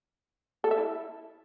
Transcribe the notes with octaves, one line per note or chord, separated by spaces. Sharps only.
A4
E5
E4